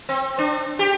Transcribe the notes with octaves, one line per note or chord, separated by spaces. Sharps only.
C4
D4
G4